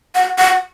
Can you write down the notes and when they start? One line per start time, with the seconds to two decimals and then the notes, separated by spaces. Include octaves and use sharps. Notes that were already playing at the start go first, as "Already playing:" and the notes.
0.15 F#5
0.38 F#5